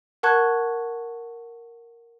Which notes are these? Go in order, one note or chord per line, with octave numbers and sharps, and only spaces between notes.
A#4 F#5 A5 C#6 F#6 G#6